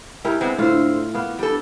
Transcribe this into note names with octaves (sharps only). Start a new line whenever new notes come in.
G#2 E4 G4 A#4
G#3 B3 C4
A2 D3 F4 C5
A#3 B3
G3 A4